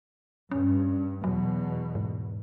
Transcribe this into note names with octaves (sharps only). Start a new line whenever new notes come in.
G2 C#4
E2 B2 F#3
G#2